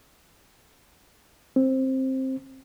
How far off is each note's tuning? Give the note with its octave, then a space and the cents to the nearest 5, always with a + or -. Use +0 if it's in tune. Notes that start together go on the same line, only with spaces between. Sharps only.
C4 +10